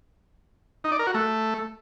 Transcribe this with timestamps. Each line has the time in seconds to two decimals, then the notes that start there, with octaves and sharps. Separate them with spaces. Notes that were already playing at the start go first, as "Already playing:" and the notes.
0.84 D#4
0.92 D5
0.99 A#4
1.07 F#4
1.14 A3